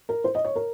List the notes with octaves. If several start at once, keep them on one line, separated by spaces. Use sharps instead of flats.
A#4
C5
D#5
C#5
A#4